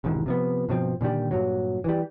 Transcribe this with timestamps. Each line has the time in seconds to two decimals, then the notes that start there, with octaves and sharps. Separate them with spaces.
0.04 E1 C2 G#2 D#3
0.26 C3 F3 B3
0.69 G2 B2 F3 C4
1.01 A#2 D3 D#3 G3
1.31 G2 A#2 F#3
1.84 E3 G3